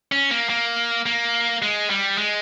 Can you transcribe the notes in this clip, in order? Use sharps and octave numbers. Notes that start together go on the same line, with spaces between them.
C#4
A#3
A#3
A#3
G#3
G3
G#3